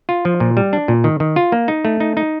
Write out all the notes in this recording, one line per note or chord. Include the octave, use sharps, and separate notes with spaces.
F4
F3
A#2
G3
D4
A#2
D#3
D#3
F4
A#3
D#4
A3
D#4
D#4